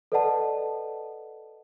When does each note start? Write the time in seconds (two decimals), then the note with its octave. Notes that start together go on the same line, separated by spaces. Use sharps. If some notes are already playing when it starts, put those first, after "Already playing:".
0.12 A4 B4 D5 D#5 F#5 A5